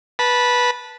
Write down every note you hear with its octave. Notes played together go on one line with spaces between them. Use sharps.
B4 A5 B5